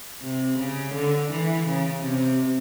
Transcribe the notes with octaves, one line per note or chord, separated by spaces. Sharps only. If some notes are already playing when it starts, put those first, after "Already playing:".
C3
C#3
D3
E3
C#3
C3